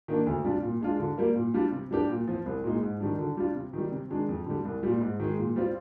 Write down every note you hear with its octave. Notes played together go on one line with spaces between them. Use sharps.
D#3 A#3 D4
D2
C3 G3 D4 F4
A#2
G#3 D4 F4
D3
G3 A#3
A#2
G3 D4 F4
C3
G3 D4 G4
A#2
F3 C4
C2
A#2 G#3 D#4
G#2
D#3 G3 D4
D3
G3 D4 F4
C3
D#3 G3
C3
D#3 G#3 D4
F2
D3 G3
C2
A#2 G3
G#2
D#3 G#3
A#2
G3 C4 F4